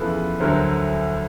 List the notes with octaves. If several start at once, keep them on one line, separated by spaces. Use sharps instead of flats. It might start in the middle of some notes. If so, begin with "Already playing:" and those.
Already playing: E2 C#3 F3 A4 B4
D2 D3 F#3 A#4 C5